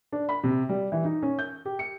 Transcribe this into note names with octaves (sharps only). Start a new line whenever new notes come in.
D4
B5
C3
G3
E3
D#4
C#4
G6
G4
C#7